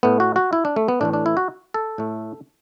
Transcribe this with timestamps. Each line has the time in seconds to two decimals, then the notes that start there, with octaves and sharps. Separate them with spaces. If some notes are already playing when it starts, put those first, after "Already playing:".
0.03 A2 A3 B3
0.20 F#4
0.36 F#4
0.53 E4
0.65 D4
0.76 A3
0.88 B3
1.01 A2 E3 A3 D4
1.13 D4
1.26 E4
1.37 F#4
1.74 A4
1.98 A2 A3